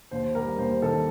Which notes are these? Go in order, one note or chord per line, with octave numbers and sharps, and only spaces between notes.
D#2 C5
G3 A#4
D#2 C5
D#3 A4